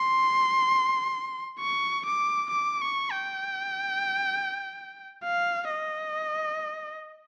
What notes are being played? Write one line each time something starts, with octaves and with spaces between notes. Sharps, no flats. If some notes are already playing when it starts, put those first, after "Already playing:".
Already playing: C6
C#6
D6
D6
C#6
G5
F5
D#5